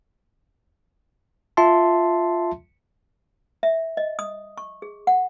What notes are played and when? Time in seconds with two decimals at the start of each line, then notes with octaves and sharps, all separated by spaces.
1.57 F4 E5 A5 C6
3.63 E5
3.97 D#5
4.19 D#6
4.58 C#6
4.82 G#4
5.07 F#5